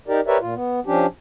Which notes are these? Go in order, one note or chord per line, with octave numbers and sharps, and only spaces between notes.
D#4 G4 A#4 D5
G4 A#4 B4 C#5 D5 E5
A#2 F4
B3
F3 C#4 D4 G4